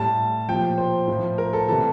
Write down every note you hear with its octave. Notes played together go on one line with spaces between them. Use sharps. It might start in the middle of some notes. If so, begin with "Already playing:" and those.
Already playing: A2 G3 A5
A#2 F3 G5
C5
A2 F3
A#4
A4
C3 E3 G3 A4